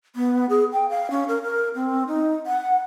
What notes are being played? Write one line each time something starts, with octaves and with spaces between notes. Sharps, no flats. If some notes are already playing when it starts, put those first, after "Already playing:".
B3
G#4
G5
F5
C#4
A#4
A#4
C4
D#4
F#5